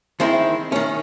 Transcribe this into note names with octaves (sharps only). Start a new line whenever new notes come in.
D#3 G#3 C4 E4
D#3 C#4